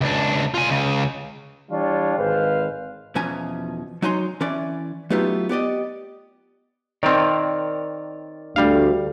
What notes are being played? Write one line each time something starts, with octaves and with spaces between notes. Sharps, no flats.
C#2 D4
F4 G#5
C#2 C#3
E3 G3 D4 F4 C#5
G#1 G#4 B4 C5 F5
E2 B2 F3 C#4 G#5 A#5
F#3 D#4 C#5 G#5 A#5 C6
E3 C#4 D5
F#3 A3 B3 D#4 F4 G4
B3 G4 D5 D#5
D#3 C4 A#4 C#5 D5
D2 G3 F5